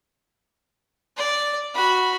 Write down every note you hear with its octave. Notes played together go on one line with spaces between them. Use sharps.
D5
F#4 B5